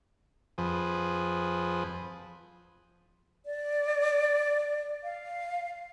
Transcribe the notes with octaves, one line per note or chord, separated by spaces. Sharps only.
F2 F3 G#4 B4
D5
F5